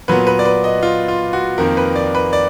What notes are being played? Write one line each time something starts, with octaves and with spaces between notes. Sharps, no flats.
A#2 F#3 B3 B4
B4
D5
B4
D#5
F4
F4
F#4
F2 D#3 A#3 A#4
B4
D5
B4
D5